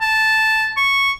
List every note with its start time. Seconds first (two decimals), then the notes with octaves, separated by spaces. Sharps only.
0.01 A5
0.77 C#6